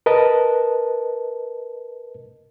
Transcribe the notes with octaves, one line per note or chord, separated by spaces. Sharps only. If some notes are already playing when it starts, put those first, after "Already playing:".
A#4 B4 D#5 A5